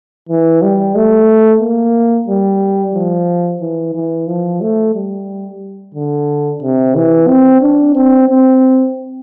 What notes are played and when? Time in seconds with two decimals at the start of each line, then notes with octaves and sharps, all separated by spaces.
0.29 E3
0.62 G3
0.96 A3
1.61 A#3
2.28 G3
2.95 F3
3.61 E3
3.95 E3
4.28 F3
4.61 A3
4.95 G3
5.94 D3
6.62 C3
6.95 E3
7.28 C4
7.62 D4
7.95 C4
8.29 C4